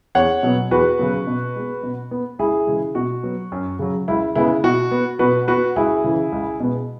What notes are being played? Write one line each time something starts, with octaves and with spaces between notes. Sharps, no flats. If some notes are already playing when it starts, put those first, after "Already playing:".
E2 C#5 F#5
B2 F#3 B3
E2 F#4 B4
C#3 F#3 B3
B2
G#3 B3
B2
B3
C#2 E4 G#4
C#3 E3 G#3
B2 F#4
F#3 B3
F#2
C#3 F#3
C#2 E4
C#3 G#3 B3 E4
B2 F#4
B3
B2 F#4 B4
B3 F#4 B4
C#2 E4 G#4
C#3 E3
C#2
B2 G#3 B3